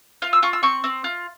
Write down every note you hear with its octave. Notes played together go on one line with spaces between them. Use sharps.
F4 F5
E6
F4 C#6
E6
C4 C#6
C4
F4